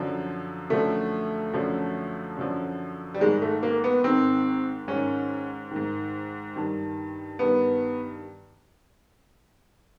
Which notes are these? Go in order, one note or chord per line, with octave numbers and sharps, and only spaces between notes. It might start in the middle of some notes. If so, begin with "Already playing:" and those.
Already playing: F#2 D3 F3
F#2 D3 F3 A3
F#2 D3 F3
F#2 D3 F3
G3
G#2 D#3 G#3
A3
A#3
B3
G#2 D#3 C4
G#2 D#3 C#4
G#2 D#3
G2 D#3
G2 D#3 B3